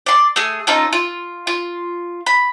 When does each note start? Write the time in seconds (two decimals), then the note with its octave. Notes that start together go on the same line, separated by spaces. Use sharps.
0.06 D5 C6
0.36 A3 G#4
0.67 C#4 D#4 F4 A4
0.93 F4
1.47 F4
2.26 B5